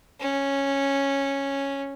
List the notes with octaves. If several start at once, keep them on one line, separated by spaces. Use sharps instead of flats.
C#4